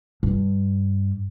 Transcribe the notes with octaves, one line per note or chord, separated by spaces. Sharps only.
G2